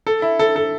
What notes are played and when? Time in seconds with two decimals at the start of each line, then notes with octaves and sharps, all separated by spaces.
0.07 A4
0.22 E4
0.39 A4
0.56 A4